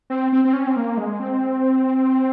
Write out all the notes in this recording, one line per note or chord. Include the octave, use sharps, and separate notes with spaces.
C4
C4
C4
C#4
C4
A#3
G#3
C4